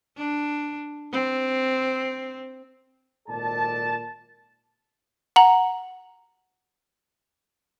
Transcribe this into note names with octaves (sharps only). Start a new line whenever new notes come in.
D4
C4
G#1 A#2 A4 D5 A5
F#5 A#5 F#7